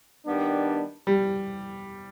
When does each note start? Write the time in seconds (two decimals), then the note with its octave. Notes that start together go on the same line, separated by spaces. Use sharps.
0.27 D#3 G3 B3 D4
1.07 G3